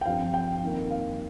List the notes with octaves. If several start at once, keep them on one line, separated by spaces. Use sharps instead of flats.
G5
G2 F3 C4 F5
G5
F2 D#3 A#3
F5